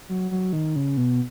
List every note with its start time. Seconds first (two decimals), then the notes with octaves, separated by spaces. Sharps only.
0.09 F#3
0.31 F#3
0.53 D#3
0.76 C#3
0.97 B2